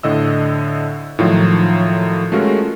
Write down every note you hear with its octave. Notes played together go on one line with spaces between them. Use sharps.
A2 D3 D#5 E6
A2 D#3 F3 F#3 D#4 F4
G#3 A3 C#4 F4 F#4 A#4